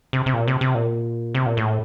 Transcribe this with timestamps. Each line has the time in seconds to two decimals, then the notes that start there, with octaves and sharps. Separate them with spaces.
0.13 C3
0.26 C3
0.34 A#2
0.48 C3
0.61 C3
0.75 A#2
1.35 C3
1.46 A#2
1.57 A2